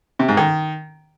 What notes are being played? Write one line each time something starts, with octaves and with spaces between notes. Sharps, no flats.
C3
G#2
D#3